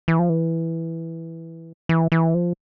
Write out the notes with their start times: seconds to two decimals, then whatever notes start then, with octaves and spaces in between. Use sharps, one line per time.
0.08 E3
0.19 F3
0.29 E3
1.89 E3
2.12 E3
2.34 F3